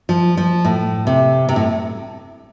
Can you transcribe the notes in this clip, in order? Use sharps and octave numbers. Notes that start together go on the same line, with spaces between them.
F3
F3
A2
C3
C3
A2